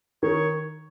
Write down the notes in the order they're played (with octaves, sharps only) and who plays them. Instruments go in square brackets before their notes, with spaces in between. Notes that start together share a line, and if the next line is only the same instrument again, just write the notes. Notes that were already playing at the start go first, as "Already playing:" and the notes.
[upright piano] D#3 [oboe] C#5